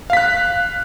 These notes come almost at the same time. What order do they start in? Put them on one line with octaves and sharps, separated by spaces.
F5 B6 F#6